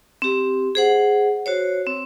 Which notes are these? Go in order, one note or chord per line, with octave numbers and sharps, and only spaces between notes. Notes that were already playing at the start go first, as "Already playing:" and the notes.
C4 G4
G#4 C5 F#5
F#4 C5 C#5
C4